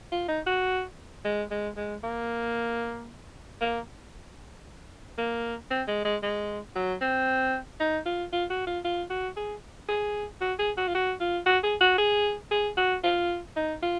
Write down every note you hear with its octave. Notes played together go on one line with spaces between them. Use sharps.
F4
D#4
F#4
G#3
G#3
G#3
A#3
A#3
A#3
C4
G#3
G#3
G#3
F#3
C4
D#4
F4
F4
F#4
F4
F4
F#4
G#4
G#4
F#4
G#4
F#4
F4
F#4
F4
F#4
G#4
F#4
G#4
G#4
F#4
F4
D#4
F4